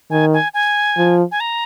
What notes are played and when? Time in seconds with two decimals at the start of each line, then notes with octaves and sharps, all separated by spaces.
0.10 D#3 G#5
0.33 G#5
0.54 G#5
0.97 F3
1.31 G#5
1.40 A#5